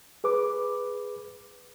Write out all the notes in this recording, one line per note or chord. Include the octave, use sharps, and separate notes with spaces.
G#4 B4 D6